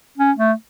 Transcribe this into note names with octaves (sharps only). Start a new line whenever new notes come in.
C#4
A3